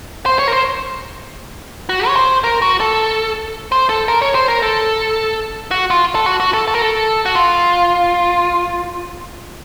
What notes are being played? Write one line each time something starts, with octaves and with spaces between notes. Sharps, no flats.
C5
C#5
A#4
C5
F#4
C#5
C5
A#4
F#4
A4
C5
A4
A#4
C#5
C5
A#4
A4
F#4
F4
A4
F#4
F#4
A4
A4
A#4
A4
F#4
F4